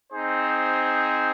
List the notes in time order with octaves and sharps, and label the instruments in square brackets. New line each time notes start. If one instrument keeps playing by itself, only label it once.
[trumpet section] C4 D#4 G#4 C5